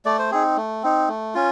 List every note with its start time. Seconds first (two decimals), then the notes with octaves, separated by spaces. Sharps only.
0.05 A3 D5
0.19 C5
0.31 C4 D#4 G#4
0.57 A3
0.83 C4 D#4
1.08 A3
1.35 C#4 F4